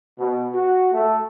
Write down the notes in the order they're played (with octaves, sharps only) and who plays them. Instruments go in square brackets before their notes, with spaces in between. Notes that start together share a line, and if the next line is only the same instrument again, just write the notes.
[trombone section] B2
F#4
A3